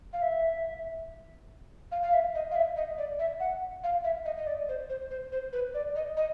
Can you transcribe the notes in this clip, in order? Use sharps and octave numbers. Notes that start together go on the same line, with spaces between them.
F5
E5
F5
F5
E5
D#5
F5
E5
D#5
D5
E5
F#5
F5
E5
D#5
D#5
D5
C5
C5
C5
C5
B4
D5
D#5
D#5